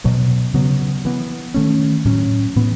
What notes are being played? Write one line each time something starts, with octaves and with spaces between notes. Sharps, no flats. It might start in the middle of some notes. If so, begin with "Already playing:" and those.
B2 F#3 B3
C#3 F#3 B3
E3 B3
D#3 A3 C#4
A2 F#3 C#4
A2 E3 B3